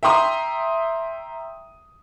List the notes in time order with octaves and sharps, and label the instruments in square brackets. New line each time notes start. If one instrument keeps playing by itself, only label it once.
[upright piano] E5 G5 A#5 C6 D#6